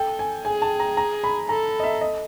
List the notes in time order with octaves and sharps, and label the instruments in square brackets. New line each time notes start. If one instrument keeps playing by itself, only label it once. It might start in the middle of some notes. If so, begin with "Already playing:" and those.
Already playing: [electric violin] A4 [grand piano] G5
[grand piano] G#5
[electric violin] G#4 [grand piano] G#5
[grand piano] A5
A#5
A#5
B5
[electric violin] A4 [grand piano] A#5
[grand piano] D#5
E5
D#5